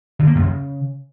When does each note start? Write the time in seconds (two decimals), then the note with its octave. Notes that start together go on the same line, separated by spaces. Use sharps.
0.19 D3
0.27 A#3
0.35 F#2
0.43 C#3